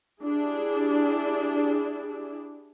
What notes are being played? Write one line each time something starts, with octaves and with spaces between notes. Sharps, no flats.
D4 E4 G4 G#4